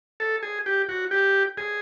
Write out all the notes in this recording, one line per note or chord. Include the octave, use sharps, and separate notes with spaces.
A4
G#4
G4
F#4
G4
G#4